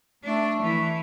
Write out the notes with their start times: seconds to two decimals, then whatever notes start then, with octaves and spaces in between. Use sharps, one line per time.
0.24 A3 D4
0.61 E3